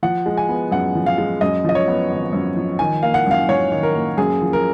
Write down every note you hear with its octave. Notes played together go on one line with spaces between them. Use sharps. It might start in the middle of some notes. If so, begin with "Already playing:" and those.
F3 F#5
G#3
G#5
B3
F#2 F#5
F3
F5
G#3
F#2 D#5
F3 D#5
C#5
B3
G#1
F#2
F3
D#3 G#5
A#3 F5
F#5
F#2 F5
F#2 C#5
D#3
A#4
A#3
F#2 G#4
F3
A#4